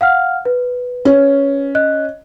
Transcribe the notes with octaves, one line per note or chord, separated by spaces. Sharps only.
F5 F#5 F6
B4
C#4
D#5 F#6